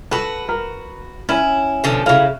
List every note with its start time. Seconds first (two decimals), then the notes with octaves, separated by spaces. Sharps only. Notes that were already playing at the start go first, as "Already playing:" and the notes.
0.11 F#4 A4 B4
0.49 A#4
1.29 C#4 E4 G#5
1.84 B2 D3 F3
2.06 C#3 F#3 E4 F5